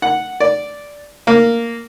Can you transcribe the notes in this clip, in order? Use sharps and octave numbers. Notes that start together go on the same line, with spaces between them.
F#5
D5
A#3